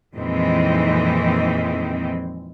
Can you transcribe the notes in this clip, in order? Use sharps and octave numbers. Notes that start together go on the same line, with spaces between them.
F2 A#2 D#3 E3 G#3 C4